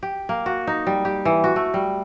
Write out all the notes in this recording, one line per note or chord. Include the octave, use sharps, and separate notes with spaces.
G4
A#3
F#4
D#4
G3
G4
E3
F#4
A3
G3